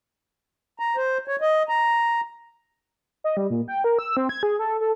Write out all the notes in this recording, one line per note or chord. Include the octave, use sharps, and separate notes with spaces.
A#5
C5
C#5
D#5
A#5
D#5
G3
A#2
G5
A#4
E6
C4
G#6
G#4
A4
A4